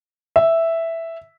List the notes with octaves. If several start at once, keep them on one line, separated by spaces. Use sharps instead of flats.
E5